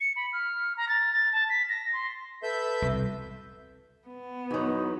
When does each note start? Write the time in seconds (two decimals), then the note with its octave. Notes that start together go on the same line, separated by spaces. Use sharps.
0.01 C#7
0.16 B5
0.33 F6
0.77 A#5
0.89 A6
1.12 A6
1.33 A5
1.49 B6
1.69 A#6
1.93 C6
2.43 A4 B4 E5 G6
2.82 C2 B2
4.06 B3
4.51 E2 F#3 D#4